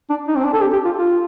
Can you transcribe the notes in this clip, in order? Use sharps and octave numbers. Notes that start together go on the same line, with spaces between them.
D4
D#4
C4
D4
A4
G4
G4
F4
F4